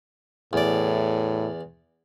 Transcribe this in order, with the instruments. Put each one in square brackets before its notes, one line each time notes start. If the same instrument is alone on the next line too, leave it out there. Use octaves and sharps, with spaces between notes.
[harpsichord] E2 D5 [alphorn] A2